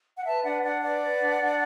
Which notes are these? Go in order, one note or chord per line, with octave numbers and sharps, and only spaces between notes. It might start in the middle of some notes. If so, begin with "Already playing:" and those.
F#5
B4 E5 A5
D4 D5 F#5
D4 D5 F#5
B4 D5 F#5
B4
D4
D4